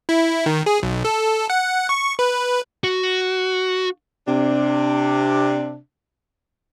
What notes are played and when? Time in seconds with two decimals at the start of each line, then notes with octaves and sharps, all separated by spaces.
0.09 E4
0.46 D#3
0.66 G#4
0.83 B1
1.05 A4
1.50 F#5
1.89 C#6
2.19 B4
2.84 F#4
4.27 C3 D4